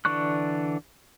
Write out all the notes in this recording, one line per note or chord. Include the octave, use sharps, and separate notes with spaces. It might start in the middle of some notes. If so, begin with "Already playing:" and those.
D3 E3 D4 C#6 F#6